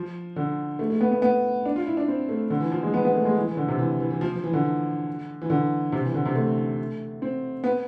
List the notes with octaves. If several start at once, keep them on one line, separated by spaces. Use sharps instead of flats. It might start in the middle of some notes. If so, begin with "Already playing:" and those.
Already playing: F3
D3
A3
A3
B3
B3
B3
D4
F4
E4
D4
C4
A3
D3
E3
F3
G#3
B3
B3
A3
G#3
E3
E3
D3
C3
E3
E3
E3
F3
F3
E3
D3
E3
D3
C3
E3
D3
C3
A3
C4
B3